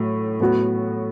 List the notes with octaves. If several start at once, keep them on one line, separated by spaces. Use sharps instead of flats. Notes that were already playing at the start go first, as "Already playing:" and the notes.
Already playing: A2 F#3 A3
A2 F#3 B3 F#4